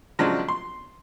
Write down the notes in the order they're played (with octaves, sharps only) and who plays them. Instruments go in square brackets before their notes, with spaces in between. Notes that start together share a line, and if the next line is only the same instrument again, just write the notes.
[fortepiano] C#3 F3 F#3 G#3 D4
C6